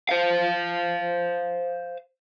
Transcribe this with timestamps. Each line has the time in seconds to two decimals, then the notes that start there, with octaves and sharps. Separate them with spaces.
0.09 C5 F5